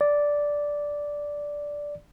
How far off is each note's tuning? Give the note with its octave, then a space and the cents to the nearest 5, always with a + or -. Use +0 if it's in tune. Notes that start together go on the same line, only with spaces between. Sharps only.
D5 -5